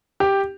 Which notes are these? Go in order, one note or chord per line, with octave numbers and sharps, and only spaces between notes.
G4